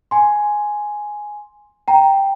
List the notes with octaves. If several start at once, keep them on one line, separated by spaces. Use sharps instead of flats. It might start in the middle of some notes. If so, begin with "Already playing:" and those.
G#5 C6
G5 A#5